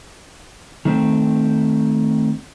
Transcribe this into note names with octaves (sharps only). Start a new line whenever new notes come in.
D#3 A3 C4